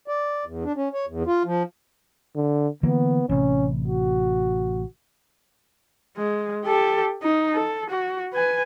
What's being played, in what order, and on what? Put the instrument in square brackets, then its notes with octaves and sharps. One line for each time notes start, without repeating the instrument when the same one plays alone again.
[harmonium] D5
E2
D4
C#4
C#5
E2
F4
F3
[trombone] D3
[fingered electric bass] D3 E3 A#3 [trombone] B3
[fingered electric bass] A1 C3 [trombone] C#4
[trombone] F#4
[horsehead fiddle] G#3
G4 A4
D#4
A4
F#4
B4 G#5